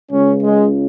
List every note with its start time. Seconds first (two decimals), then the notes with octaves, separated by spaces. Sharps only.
0.11 C#2 C#3 C#4
0.43 G#3